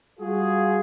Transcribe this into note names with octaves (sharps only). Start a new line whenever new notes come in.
G3 F4 F#4 G#4